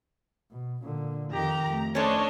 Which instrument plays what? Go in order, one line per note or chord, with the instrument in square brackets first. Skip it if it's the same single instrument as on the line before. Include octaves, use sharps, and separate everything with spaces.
[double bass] B2
A#2 D3
[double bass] F2 D#3 [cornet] G4 [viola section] A#5
[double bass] F2 A3
[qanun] C#4 A4 [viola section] D4 C#5 D#5 [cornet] C5